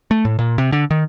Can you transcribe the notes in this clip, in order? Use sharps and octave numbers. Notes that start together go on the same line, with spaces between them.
A3
A2
A#2
C3
D3
D#3